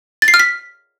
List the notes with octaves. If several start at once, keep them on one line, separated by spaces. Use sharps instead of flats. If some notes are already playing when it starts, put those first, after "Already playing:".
A6
C7
F6
B6